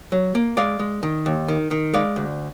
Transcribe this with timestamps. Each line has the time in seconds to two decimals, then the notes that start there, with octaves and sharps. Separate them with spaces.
0.12 F#3
0.35 A#3
0.57 G#3 D5 F5
0.79 G#3
1.03 D#3
1.26 D#2
1.48 D#3
1.71 D#3
1.94 G#3 D5 F5
2.16 D2